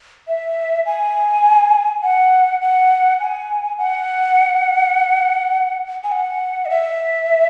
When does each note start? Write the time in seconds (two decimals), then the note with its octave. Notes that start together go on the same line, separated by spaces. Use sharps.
0.28 E5
0.86 G#5
2.03 F#5
2.61 F#5
3.20 G#5
3.78 F#5
6.04 G#5
6.12 F#5
6.66 D#5
6.70 E5